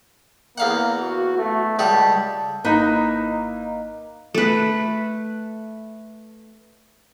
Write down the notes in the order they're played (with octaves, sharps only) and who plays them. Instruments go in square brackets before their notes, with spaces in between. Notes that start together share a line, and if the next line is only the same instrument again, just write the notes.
[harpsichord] E2 F5 F#5 [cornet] A#3
[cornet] F#4
A3
[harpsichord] C#2 G3 F#5 [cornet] A5
[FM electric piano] G#1 D#5 A#5 [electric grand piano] A#3 D#7 [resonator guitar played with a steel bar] D#4 E4 B4
[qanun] A3 B4